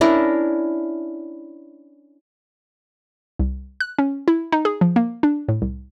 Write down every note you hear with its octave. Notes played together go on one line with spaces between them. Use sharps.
C#4 D4 E4 A#4
C2
F#6
C#4
E4
D#4
G#4
F3
A#3
D4
A2
C2